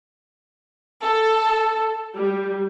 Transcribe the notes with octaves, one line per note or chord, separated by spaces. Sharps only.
A4
G3